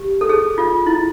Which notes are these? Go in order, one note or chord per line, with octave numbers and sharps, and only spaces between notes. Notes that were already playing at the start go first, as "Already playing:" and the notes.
Already playing: G4
A4
G#4
F4
E4